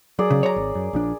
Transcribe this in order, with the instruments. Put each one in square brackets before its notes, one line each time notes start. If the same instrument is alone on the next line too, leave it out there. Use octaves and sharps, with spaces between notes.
[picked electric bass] F#3 [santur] G#4 A#4 D5
[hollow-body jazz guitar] C#3
C#5 A#5
[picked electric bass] G#1
F#2
A#1 F3 D4